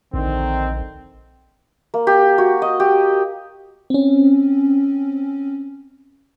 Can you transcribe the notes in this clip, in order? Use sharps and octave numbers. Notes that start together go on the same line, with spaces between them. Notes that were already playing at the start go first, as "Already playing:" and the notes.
A#1 D3 D#3 C4
A#3
G4
F#4
D#5
G4
C4 C#4